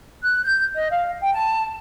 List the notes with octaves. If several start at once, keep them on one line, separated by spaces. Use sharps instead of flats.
F#6
G6
D#5
F5
G5
A5